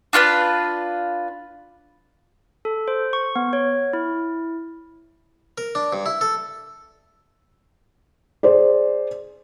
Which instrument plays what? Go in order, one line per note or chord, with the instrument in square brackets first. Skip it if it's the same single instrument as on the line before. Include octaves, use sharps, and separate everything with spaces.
[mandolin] D4 F4 A#4 B4
[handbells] A4
C5
C#6
B3
C#5
E4
[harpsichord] A#4
D4
G2
E4
A4
[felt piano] G#4 C5 D5